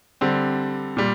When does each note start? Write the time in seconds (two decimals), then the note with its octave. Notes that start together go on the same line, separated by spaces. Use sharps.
0.21 D3 G3 C4
0.97 A#2 G3